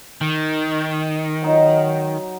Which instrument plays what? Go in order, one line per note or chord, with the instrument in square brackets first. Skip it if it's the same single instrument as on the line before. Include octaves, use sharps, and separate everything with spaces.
[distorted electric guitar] D#3
[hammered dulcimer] F#3 D#4